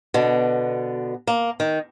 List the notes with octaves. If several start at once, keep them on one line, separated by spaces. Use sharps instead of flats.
B2 D3
A#3
D#3